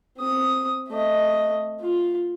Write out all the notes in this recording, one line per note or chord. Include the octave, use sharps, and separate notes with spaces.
C4 D#6
A3 D#5
F4